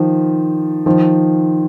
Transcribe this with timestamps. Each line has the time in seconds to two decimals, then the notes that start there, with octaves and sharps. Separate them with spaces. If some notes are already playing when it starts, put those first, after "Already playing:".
Already playing: D#3 F3
0.86 D#3 F3